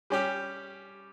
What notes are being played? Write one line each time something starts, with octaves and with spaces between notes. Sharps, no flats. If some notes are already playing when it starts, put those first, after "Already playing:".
G3 C#4 G4